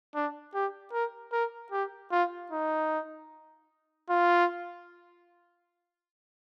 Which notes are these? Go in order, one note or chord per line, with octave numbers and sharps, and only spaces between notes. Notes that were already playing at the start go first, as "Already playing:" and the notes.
D4
G4
A#4
A#4
G4
F4
D#4
F4